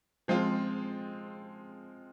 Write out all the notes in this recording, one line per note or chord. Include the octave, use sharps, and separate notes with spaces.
F3 G#3 C4 F4